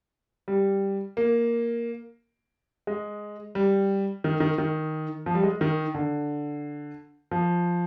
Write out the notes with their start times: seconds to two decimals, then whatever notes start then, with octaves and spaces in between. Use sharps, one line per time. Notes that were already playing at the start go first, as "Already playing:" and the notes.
0.48 G3
1.17 A#3
2.87 G#3
3.55 G3
4.24 D#3
4.40 D#3
4.58 D#3
5.26 F3
5.35 G3
5.43 G#3
5.61 D#3
5.94 D3
7.31 F3